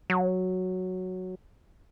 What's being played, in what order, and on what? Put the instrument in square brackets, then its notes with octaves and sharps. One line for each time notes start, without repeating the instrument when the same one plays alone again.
[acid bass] F#3